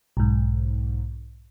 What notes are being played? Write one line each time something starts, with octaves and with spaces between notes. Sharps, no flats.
B1 G#2